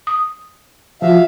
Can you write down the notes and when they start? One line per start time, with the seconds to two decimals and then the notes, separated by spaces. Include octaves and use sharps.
0.07 D#6
1.02 F3 F4 F#4 E5 F5